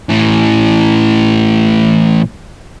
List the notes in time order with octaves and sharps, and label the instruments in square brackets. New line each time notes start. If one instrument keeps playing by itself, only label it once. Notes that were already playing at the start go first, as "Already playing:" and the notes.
[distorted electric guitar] A2 E3